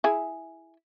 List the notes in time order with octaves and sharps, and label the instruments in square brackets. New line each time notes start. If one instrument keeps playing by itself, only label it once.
[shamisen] E4 G#4